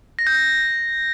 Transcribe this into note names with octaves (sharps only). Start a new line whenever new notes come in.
A#6
G6
A#6